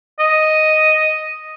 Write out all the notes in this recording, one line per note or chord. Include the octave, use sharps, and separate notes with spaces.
D#5